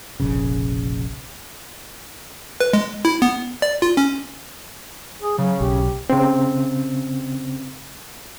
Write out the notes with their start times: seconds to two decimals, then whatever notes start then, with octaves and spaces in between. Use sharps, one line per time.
0.20 F1 A#1 C#3
2.60 B4
2.73 G#3
3.05 E4
3.22 B3
3.62 D5
3.82 F4
3.97 C#4
5.21 G#4
5.38 C#3 F#3
5.60 B1 G4
6.10 C#3 C4